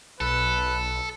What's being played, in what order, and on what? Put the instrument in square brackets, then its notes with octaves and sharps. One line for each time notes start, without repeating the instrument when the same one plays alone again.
[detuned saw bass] B1 [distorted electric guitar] A4 [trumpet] B4